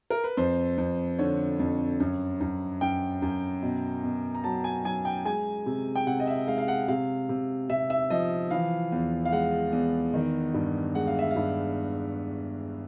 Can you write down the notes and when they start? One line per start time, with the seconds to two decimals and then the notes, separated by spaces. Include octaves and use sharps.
0.10 A#4
0.24 B4
0.37 F2 C5
0.78 F2
1.19 D3 C#5
1.59 F2
2.00 F#2
2.41 F#2
2.81 F#2 G5
3.22 F#2
3.62 B2
4.03 B2
4.35 A#5
4.44 F#3 A5
4.64 G#5
4.84 F#3 G#5
5.05 G5
5.25 G#3 G#5
5.66 C3
5.96 G5
6.07 C3 F#5
6.20 D#5
6.27 E5
6.47 G#3 F5
6.58 F5
6.68 F#5
6.88 C3 F5
7.29 C3
7.69 C3 E5
7.90 E5
8.10 F3 D#5
8.51 E3 F5
8.92 E2
9.25 F5
9.32 G#3 F#5
9.72 E2
10.14 D#3
10.54 G2
10.95 G#3 F#5
11.07 F5
11.19 E5
11.31 F5
11.36 G2